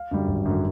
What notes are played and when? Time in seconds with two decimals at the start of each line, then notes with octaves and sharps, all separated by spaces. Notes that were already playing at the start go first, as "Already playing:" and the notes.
Already playing: F5
0.11 F#2 D3 G3
0.28 G#1
0.45 F#2 D3 G3